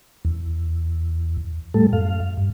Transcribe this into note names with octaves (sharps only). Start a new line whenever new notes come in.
E2
A2 G3 A3 A4
F#2 F5
G2